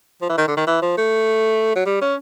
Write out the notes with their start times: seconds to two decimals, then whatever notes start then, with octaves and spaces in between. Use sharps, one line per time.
0.21 F3
0.29 E3
0.37 D#3
0.47 D3
0.57 D#3
0.67 E3
0.82 F3
0.97 A3
1.75 F#3
1.86 G3
2.01 C#4